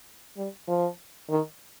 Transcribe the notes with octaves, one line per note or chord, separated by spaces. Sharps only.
G3
F3
D#3